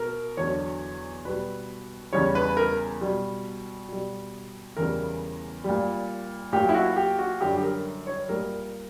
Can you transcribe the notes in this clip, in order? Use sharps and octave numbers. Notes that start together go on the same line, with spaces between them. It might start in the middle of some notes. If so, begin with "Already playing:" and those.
Already playing: B2 A#4
E2 D3 F#3 C#5
B2 G3 B4
E2 C#3 G3 C#5
B4
A#4
B2 G3
B2 G3
E2 C#3 E3 G3 A#4
A#2 G3
A#2 F#3 G4
E4
F#4
G4
F#4
F#2 D3 G3 G4
G4
A#4
C#5
A#2 G3 A#4